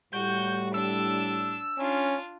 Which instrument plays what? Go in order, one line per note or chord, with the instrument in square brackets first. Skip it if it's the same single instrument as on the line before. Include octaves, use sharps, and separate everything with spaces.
[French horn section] A2 G3 [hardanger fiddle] F#4 [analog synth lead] G6
[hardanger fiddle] D4 [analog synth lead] E6
[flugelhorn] C#4 [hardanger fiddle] D4 F4